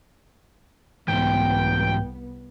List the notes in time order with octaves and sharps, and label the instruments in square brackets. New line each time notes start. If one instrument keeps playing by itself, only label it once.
[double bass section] C2 B3 [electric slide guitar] G#2 E3 [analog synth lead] G5